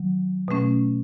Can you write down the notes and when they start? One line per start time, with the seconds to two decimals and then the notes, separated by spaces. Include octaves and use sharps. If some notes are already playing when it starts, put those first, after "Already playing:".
Already playing: D#3 F#3
0.48 B2 A3 C#4